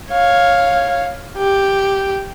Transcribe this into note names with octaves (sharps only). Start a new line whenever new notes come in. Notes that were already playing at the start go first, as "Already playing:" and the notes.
C#5 F5
G4